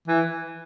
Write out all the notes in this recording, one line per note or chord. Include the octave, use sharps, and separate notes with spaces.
E3